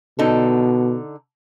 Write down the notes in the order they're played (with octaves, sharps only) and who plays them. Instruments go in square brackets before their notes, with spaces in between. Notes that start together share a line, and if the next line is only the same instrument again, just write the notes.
[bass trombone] B2 [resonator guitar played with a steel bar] D3 D#4 A4